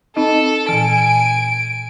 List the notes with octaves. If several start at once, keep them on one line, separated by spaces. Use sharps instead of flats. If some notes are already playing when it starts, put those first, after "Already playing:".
C4 D#4 A4 D#5
A#2 E3 G#5 D7